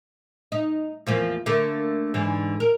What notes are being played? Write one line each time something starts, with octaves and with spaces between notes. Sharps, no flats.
D#4
E2 F3 A#3
D3 A3 A#3
G#2 D3 E3
A#4